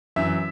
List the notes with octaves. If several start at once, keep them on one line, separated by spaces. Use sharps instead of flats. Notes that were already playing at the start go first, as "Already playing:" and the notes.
F#2 E3 E5